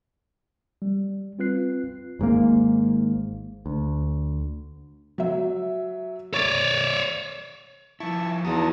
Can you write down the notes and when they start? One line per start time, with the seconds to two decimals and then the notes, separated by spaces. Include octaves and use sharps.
0.82 G3
1.39 C4 F4 B4 F#6 C7
2.19 G#1 G#2 D#3 A#3
3.66 D2
5.18 F#3 E5
6.34 C#5 D5 C#6
8.00 F3 E4 E5 A5 C#6
8.45 E2 D#4 F#4 A5 A#5 D#6